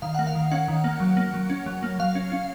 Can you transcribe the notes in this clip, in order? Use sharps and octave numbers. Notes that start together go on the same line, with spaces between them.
D#3 F5
A#3 F#5
F5
D#3
C#4 F#5
D#3
A#3
F#3
A#3
F#3
C#4
F#3
A#3
F#3 F5
C#4
C#4